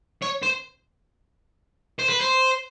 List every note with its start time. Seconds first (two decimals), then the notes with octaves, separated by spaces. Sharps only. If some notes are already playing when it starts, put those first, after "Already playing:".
0.22 C#5
0.43 C5
1.99 C5
2.10 B4
2.21 C5